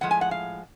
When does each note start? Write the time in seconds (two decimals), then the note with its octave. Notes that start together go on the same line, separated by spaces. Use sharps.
0.01 A2 F3 G#3 F#5
0.11 G#5
0.21 F#5
0.31 F5